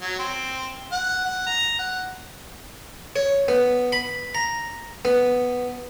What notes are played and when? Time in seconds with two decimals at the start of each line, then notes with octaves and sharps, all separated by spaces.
0.01 F#3
0.19 C4
0.92 F#5
1.25 F#5
1.47 A#5
1.79 F#5
3.16 C#5
3.48 B3
3.92 B5
4.35 A#5
5.05 B3